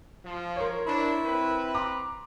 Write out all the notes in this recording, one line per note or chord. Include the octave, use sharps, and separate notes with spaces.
F3
A#4 C5 C#5
D4 E4
C4 B4
A#5 C6 D6